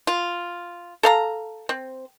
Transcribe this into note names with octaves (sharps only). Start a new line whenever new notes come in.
F4
A4 F5 A#5
C4